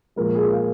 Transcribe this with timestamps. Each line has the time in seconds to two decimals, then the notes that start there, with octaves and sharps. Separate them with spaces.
0.16 A#2 F3 G#3 A#4
0.35 G#4
0.53 F5